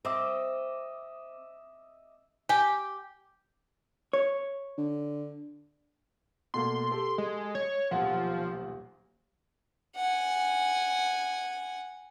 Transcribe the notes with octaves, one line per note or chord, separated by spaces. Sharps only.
C4 D#5 E5 D6
G4 G#5
C#5
D3
B2 A3 A#3 C6
G4 A4
G#3
C#5
D#1 B1 F3 F#5
F#5 G#5